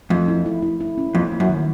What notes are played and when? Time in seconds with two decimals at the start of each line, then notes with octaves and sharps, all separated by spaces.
0.10 F2 A3
0.28 E4
0.46 E4
0.62 E4
0.80 E4
0.98 C#4
1.15 F2 A#3
1.32 A#3
1.40 F#2
1.49 D#3